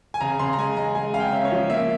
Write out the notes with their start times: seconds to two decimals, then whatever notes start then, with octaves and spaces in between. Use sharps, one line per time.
0.14 G#5
0.21 C#3 A#5
0.39 C#3 C6
0.53 A#5
0.58 G#3 G#5
0.77 G#3 A#5
0.95 G#3 G#5
1.14 C#3 F5
1.20 G5
1.32 C#4 E5
1.45 C#5
1.52 F3
1.70 A#3 E5